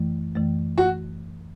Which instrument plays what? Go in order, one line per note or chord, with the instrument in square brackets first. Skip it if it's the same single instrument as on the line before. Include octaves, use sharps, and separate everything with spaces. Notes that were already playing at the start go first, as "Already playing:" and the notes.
Already playing: [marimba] F#2 E3 A3
F#2 E3 A3
[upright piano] F#4